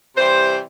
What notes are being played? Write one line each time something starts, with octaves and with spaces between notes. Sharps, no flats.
C3 E3 G3 C5